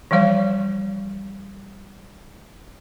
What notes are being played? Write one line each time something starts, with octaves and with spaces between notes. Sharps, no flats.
E3 F3 G3 C#5 F5